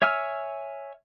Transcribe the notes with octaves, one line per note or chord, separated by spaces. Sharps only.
C#5 E5 G#5 E6 F6